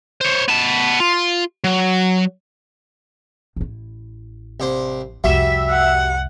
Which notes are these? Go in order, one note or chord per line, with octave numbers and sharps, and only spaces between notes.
C5 C#5
B3 A5
F4
F#3
A1 E4
C2 D4 C5
C2 F2 G3 F#4 E5
F#5